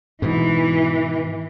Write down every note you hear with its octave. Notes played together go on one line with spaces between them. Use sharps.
G#2 B2 E3